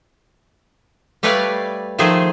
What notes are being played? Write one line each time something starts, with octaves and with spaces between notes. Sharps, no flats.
G3 A3 B4 C#5 D5 F5
D#3 F3 A3 G#4 C5